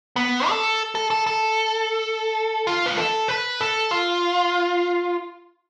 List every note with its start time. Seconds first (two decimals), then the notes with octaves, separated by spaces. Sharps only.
0.16 B3
0.49 A4
0.95 A4
1.10 A4
1.27 A4
2.67 F4
2.86 B4
2.97 A4
3.28 B4
3.61 A4
3.91 F4